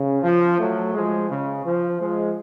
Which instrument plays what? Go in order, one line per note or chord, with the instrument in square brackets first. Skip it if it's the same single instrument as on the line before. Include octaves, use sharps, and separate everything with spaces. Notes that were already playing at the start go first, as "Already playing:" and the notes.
Already playing: [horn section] C#3
F3
F#3 A3
F3 G#3
C#3
F3
F3 G#3